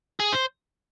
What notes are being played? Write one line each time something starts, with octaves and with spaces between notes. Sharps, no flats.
G#4
C5